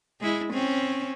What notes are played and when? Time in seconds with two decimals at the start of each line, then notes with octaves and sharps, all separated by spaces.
0.21 G#3 E4
0.53 C4 C#4